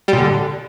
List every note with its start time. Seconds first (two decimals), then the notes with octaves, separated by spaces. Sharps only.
0.08 G3
0.13 A#2
0.18 D3